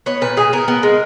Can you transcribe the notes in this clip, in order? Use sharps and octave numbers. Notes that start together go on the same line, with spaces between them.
B3 C#5
A#2 B4
A#2 G#4
B3 A#4
B3
G#3